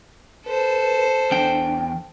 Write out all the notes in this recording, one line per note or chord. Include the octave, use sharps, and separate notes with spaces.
A4 B4 C5
E2 D4 G5